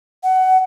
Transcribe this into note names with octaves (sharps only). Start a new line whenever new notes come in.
F#5